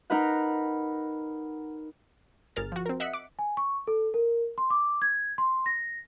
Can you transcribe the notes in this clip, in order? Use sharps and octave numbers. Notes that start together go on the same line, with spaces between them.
D#4 A#4 B4 F#5
G1 G#4 A#4 F6 A6
F3 F#4
C4 A#4
D#5 E5 F#5 F#6 B6 C#7
D6
G#5
C#6
A4
A#4
C6
D6
G#6
C6
A#6